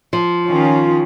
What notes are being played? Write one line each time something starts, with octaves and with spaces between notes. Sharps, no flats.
F3
D#3 C#4 F4